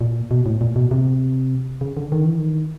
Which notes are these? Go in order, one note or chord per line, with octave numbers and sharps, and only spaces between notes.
A#2
B2
A2
A#2
B2
C3
C#3
D3
D#3
E3
D#3